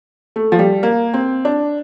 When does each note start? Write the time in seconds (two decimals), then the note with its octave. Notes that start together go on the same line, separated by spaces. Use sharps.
0.36 A3
0.52 F3
0.59 G3
0.83 A#3
1.14 C4
1.45 D4